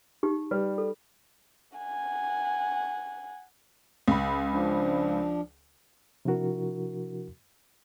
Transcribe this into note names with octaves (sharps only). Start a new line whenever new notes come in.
D#4 G4
G3 B4
A4
F#5 G#5
C#2 B5
F3 D4
C3 F3 D4 E4 F#4 A#4